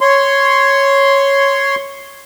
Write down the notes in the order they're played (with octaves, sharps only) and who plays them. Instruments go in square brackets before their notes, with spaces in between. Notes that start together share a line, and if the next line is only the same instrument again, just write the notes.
[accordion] C#5 C6